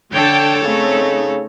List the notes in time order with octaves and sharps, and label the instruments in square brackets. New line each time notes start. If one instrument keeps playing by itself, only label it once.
[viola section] D3 G5 A5 [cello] A4 C#5
[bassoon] C#3 [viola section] A3 C4 D#4